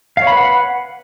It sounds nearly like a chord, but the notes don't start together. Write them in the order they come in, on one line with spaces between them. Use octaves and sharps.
F5 C#5 B5 B4 F#5